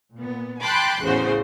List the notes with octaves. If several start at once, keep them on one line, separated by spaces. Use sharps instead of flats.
A#2 B3
G5 A5 B5 C6 D6 F#6
A1 E2 C#3 F#4 C5